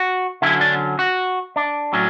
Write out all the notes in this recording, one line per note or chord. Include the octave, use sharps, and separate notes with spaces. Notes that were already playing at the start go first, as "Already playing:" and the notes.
Already playing: F#4
D3 F#3 C#4 E4
D4
F#4
D4
A2 F#3 C#4